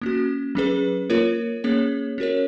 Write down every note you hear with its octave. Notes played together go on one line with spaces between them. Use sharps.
A#3 C#4 F#4
F#3 C#4 G#4 B4
A#3 F4 A#4 C#5
A#3 C#4 G#4 C#5
C#4 F#4 A#4 C#5